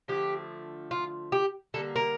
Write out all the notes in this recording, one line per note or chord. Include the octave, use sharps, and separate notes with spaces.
D3 F3 A3 G4
F4
G4
D3 G3 A#3 A4
A#4